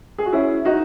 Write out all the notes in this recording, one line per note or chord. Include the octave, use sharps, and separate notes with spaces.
G#4
F#4
C#4 E4
D#4 F#4